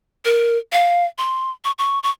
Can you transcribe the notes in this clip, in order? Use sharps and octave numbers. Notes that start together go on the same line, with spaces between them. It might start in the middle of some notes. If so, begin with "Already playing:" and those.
A#4
F5
C6
C#6
C#6
C#6